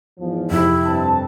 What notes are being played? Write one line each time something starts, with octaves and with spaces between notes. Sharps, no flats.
E2 G#2 F3
F2 C3 E4
G2 C4 A5